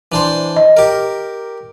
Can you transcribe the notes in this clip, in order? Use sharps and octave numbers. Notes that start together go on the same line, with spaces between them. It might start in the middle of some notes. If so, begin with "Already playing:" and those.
E3 D4 C5
D#5
G4 A#4